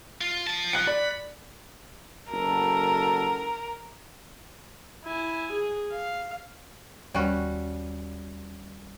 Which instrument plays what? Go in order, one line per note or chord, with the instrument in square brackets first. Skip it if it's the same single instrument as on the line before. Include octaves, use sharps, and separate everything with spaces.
[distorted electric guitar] F4
F3 A5
[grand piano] F#6 C#7
[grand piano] D5 [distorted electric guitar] B5
[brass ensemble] F#1 F#4 A4 [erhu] A#4
[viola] E4 G#5
G#4
F5
[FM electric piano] D#2 [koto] G3 C#4 F#4